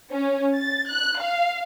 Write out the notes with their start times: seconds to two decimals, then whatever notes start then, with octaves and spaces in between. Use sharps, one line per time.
0.12 C#4
0.57 A6
0.91 F#6
1.20 F5